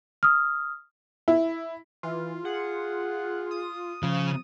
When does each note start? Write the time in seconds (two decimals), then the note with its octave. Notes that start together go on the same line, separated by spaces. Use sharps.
0.23 D#6 F6
1.28 E4
2.03 E3 F4
2.45 G#4 F#5
3.51 D#6
4.03 C#3 F3